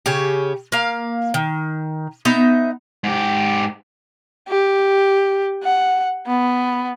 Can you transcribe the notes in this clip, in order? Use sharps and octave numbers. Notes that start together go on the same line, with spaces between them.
C#3 C#4 G4
A#3 F5
D#3
B3 D#4 D#5 E5
G#2 G4
G4
F#5
B3